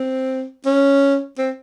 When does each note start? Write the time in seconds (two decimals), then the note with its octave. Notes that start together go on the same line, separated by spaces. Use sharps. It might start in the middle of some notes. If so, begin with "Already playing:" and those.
Already playing: C4
0.66 C#4
1.38 C4